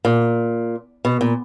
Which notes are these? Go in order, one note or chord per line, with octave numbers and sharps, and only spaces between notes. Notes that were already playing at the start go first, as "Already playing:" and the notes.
A#2
B2
A#2